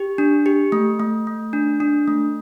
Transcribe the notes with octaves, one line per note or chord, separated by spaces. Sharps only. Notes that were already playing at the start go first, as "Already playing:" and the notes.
Already playing: G4
D4
G4
A3
A3
A3
D4
D4
A3